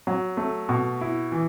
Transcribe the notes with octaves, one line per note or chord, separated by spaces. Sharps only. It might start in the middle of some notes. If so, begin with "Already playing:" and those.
F#3
A3
B2
E4
E3